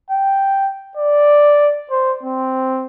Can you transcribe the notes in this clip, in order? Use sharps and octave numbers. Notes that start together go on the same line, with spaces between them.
G5
D5
C5
C4